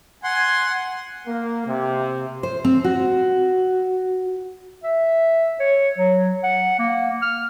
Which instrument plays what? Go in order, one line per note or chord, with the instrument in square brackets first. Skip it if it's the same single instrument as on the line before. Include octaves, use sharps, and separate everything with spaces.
[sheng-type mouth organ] F#5 C6 [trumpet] G#5
[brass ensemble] A#3
C3
[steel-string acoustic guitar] C5
C4
F#4
[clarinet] E5
C#5
F#3
F#5
A#3
F6